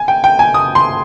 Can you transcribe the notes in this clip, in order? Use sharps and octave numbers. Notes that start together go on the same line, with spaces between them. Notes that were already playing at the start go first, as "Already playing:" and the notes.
Already playing: G#5
G5
G5
G#5
D#6
C6